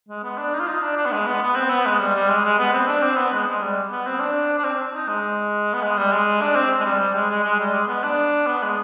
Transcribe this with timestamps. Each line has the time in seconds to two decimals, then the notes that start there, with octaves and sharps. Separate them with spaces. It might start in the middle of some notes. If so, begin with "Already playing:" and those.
0.09 G#3
0.23 B3
0.38 D4
0.54 D#4
0.60 F4
0.68 D#4
0.82 D4
0.97 D4
1.06 B3
1.12 G#3
1.26 B3
1.42 B3
1.56 C4
1.70 B3
1.86 G#3
2.00 G3
2.15 G3
2.29 G#3
2.45 G#3
2.58 B3
2.73 C4
2.88 D4
3.02 C4
3.17 B3
3.33 G#3
3.47 G#3
3.62 G3
3.92 B3
4.07 C4
4.20 D4
4.59 D4
4.65 C4
4.94 D#4
5.09 G#3
5.73 B3
5.83 G#3
5.98 G3
6.12 G#3
6.42 D4
6.55 C4
6.81 G#3
6.85 G3
7.00 G3
7.15 G#3
7.30 G#3
7.44 G#3
7.60 G3
7.74 G#3
7.88 B3
8.04 D4
8.47 B3
8.63 G#3